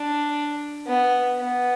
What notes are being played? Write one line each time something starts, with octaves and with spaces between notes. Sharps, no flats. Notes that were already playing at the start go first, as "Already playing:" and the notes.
Already playing: D4
B3
B3